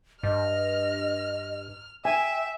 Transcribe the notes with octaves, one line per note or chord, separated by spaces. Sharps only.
G2 D#5 F6
E5 G5 G#5